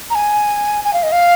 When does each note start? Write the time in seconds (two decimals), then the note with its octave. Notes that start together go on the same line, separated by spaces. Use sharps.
0.10 A#5
0.15 G#5
0.84 G#5
0.94 F5
1.03 D#5
1.12 F5